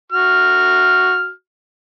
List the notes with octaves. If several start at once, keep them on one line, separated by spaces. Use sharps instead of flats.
F#4 F6